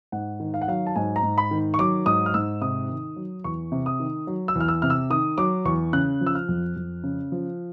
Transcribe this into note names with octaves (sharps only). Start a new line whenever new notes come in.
G#2 F#5
D#3
F5
F#5
F#3 F5
A5
G#2 G#5
A#5
G#2
B5
D#3
C#6
F#3 D6
G#2 D#6
F6
G#2 E6
C3 D#6
D#3
F#3
E2 C#6
C3
D#6
D#3
F#3
E6
E2
F6
E6
C3 F6
E6
D#3 D#6
F#3 D6
E2 C#6
C#3 F#6
F3
E6
F6
F2
F2
C#3
F3